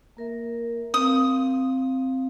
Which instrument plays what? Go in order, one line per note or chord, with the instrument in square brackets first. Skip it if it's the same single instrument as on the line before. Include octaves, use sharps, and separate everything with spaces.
[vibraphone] A#3 A#4 E5
[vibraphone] C4 F5 [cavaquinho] D#6